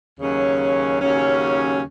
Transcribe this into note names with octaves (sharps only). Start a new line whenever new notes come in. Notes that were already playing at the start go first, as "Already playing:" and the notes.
D#2 C#3 F#3 C#4
D#2 C#3 F#3 C#4